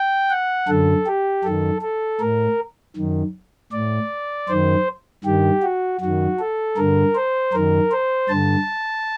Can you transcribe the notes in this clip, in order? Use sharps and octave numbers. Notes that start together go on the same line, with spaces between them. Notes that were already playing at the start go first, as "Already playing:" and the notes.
Already playing: G5
F#5
F#2 D3 A4
G4
F#2 D#3 A4
A4
A2 A#4
F#2 D#3
A2 D5
F#2 D#3 C5
G2 D#3 G4
F#4
F#2 D#3 F#4
A4
G2 D3 A#4
C5
F#2 D#3 A#4
C5
G2 D3 A5